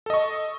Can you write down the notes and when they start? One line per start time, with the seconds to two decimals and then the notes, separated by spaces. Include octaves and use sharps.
0.06 A4
0.10 D#5
0.14 C#6